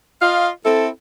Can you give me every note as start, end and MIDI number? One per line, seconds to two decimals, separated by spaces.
0.21 0.48 65
0.21 0.48 75
0.21 0.48 77
0.65 0.88 60
0.65 0.88 64
0.65 0.88 69